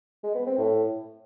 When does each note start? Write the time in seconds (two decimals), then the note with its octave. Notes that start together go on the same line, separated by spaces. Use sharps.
0.23 G#3
0.35 B3
0.46 C4
0.58 A2